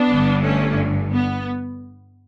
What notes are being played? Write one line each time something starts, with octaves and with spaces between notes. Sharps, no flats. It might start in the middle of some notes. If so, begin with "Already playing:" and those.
Already playing: B3 D4
G1 G2 D3
A3 C#4
B3